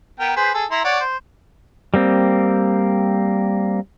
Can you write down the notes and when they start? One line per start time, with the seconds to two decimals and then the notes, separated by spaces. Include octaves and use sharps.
0.20 B3 A#4 G5
0.36 G#4 B4 C5
0.54 G#4 A4
0.71 E4 A#5 C6
0.84 C#5 D5 F#5
1.00 C5
1.94 G3 A#3 C4